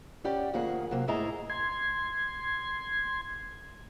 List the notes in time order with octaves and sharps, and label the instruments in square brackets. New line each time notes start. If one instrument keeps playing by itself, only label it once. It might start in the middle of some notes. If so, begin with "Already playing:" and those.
[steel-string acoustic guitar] C#4 G4 D5 F#5
D2 F3 A#3 G#4 F#5
C3 F#3 A#3
G#2 A3 E4 G#4 D#5 A#5
[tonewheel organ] C6 G#6